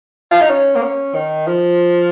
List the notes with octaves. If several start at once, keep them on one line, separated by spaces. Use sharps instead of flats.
F4
D#4
C#4
A#3
C#4
D#3
F3